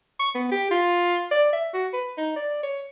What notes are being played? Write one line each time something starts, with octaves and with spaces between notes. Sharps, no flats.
C#6
B3
G4
F4
D5
E5
F#4
B4
D#4
D5
C#5